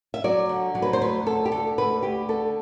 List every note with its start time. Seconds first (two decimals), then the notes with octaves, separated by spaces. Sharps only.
0.14 E5
0.24 F#3 D5
0.49 D3
0.75 F#3
0.82 B4
0.93 C5
1.01 D2 B4
1.26 D2 A4
1.45 G4
1.52 D3 A4
1.78 D2 B4
2.03 D2 G4
2.29 D3 A4